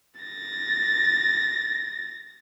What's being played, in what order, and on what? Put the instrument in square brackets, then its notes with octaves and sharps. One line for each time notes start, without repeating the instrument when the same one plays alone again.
[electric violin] A6 A#6